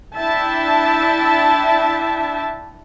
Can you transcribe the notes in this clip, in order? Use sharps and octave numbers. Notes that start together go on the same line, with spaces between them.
D4 E4 E5 G5 A5